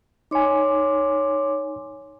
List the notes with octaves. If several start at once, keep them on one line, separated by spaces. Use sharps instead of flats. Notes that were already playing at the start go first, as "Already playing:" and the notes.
D#4 C#5 G#5 C6 D6